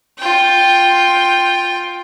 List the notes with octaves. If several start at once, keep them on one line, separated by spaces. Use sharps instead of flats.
F4 G5